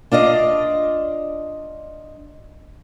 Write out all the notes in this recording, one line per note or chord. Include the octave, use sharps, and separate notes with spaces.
D4 F4 D5 D#5